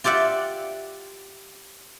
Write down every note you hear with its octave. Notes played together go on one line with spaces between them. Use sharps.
F4 G4 D5 E5 F#5